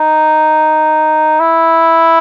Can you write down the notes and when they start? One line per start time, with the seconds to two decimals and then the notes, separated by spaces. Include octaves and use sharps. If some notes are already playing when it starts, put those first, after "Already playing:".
Already playing: D#4
1.40 E4